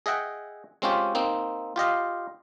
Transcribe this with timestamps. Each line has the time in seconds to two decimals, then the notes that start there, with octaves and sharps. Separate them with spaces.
0.06 G#4 D#5 E5 F#5 G5
0.82 G#3 C4 C#4 F4 G4
1.15 A#3 C4 D#4
1.76 F4 G4 D#5 F5